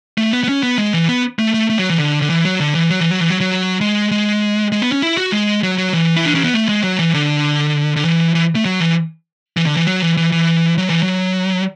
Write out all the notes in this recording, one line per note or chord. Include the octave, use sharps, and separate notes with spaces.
A3
B3
B3
C#4
B3
G#3
E3
B3
A3
A3
A3
F#3
E3
D3
D3
E3
F#3
D3
E3
F#3
E3
F#3
E3
F#3
F#3
G#3
G#3
G#3
B3
C#4
E4
F#4
G#3
F#3
F#3
E3
E4
D4
C#4
B3
A3
G#3
F#3
E3
D3
D3
E3
E3
A3
F#3
E3
E3
D3
E3
F#3
E3
E3
E3
F#3
E3
F#3